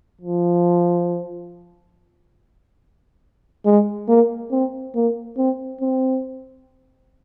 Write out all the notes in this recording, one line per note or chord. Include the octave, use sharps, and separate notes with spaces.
F3
G#3
A#3
C4
A#3
C4
C4